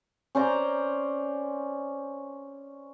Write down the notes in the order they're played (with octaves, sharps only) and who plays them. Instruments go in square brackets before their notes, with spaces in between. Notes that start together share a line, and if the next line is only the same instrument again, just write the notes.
[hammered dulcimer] C#4 C5 D5 A#5